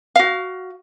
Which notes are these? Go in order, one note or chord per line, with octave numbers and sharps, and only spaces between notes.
F#4 F5